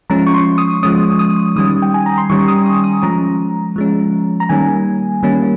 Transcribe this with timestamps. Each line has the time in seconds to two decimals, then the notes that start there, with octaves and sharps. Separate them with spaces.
0.10 F3 G#3 C#4 A#5
0.27 C#6
0.34 C6
0.58 D#6
0.83 F3 G#3 C#4 D#6
1.19 D#6
1.56 D#3 G3 C#4 D#6
1.82 G5
1.94 G#5
2.06 A#5
2.18 C6
2.30 D#3 G3 C#4 C#6
2.48 D#6
2.66 D#6
2.84 D#6
3.02 F3 G#3 C#4 A#5
3.76 F3 G#3 C#4
4.40 A#5
4.49 D#3 G3 A#3 C#4 G#5
5.23 D#3 G3 A#3 C#4